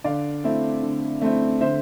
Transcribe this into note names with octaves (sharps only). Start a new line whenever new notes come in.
D3 D5 F5
A3 C4 E4
D3
A3 C4 E4
D3 C5 E5